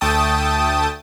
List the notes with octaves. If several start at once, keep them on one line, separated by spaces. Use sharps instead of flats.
D2 A3 G5 A5 D#6